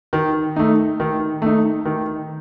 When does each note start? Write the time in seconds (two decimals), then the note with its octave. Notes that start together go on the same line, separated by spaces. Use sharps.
0.13 D#3
0.56 A3 D#4
1.00 D#3
1.42 A3 D#4
1.85 D#3